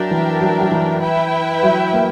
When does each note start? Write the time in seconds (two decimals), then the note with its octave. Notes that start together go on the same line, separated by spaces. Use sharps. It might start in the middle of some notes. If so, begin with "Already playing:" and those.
Already playing: F#3 D4 A#4 E5 G5
0.11 E3
0.41 F#3
0.61 F#3
0.72 E3
1.01 E4 B4 E5 G5
1.63 F#3
1.93 A#3